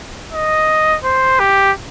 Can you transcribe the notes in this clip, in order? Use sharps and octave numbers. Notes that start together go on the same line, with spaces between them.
D#5
C5
G4